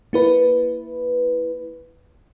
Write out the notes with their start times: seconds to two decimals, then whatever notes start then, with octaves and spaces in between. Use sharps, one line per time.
0.13 A#3 E4 B4